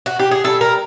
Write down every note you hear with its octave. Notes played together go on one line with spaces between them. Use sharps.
F#4
G4
G#4
G3 A4
A#4